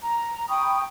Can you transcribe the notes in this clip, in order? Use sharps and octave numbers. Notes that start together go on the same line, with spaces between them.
A#5
G5 B5 C#6 D#6